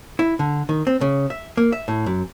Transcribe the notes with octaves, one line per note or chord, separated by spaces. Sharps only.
E4
D3
D#3
C4
C#3
E5
A#3
E5
A2
F#2